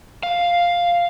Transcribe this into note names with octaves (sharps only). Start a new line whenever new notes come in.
F5